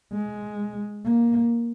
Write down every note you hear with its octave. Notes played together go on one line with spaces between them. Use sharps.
G#3
A#3